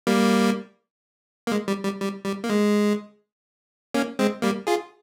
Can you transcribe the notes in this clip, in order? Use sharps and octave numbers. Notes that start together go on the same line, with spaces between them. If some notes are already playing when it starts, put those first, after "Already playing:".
G3 A#3
A#3
G#3
G3
G3
G3
G3
A#3
G#3
A#3 C#4
G#3 C4
G3 A#3
F4 G#4